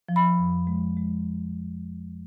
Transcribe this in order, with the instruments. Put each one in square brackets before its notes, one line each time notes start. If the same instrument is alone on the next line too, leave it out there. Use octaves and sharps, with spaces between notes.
[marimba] F3
B5
F2
G#3
G#3